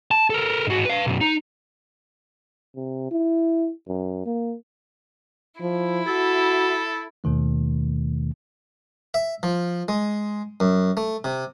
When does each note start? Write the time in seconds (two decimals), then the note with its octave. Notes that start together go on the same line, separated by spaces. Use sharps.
0.11 A5
0.30 A4 A#4
0.67 G#2 F#4
0.85 B4 F5
1.07 B1 F#2
1.21 D#4
2.76 C3
3.11 E4
3.88 F#2
4.26 A#3
5.61 F3 E4
6.07 F#4 A4
7.24 D#2 B2 D#3 A3
9.14 E5
9.43 F3
9.88 G#3
10.60 F#2
10.97 A3
11.24 C3